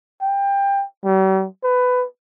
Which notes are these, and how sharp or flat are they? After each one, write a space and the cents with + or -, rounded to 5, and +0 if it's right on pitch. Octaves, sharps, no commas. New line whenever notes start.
G5 +25
G3 -45
B4 +15